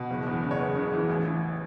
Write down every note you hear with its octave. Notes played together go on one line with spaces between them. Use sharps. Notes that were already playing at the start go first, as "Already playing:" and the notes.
Already playing: B2
F#1
E2
C#3
C#5
F#1 B4
C#3
E3
A1
E3